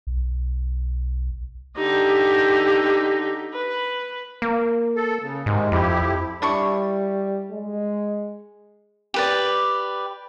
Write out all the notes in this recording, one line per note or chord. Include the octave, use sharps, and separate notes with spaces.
B1
D3 D#4 G4
B4
A#3
A4
C#3
G#2 C3 D#3 G#3
F2 F3 E4 G4
G3 D4 E4 C#6
G#3
G4 B4 D5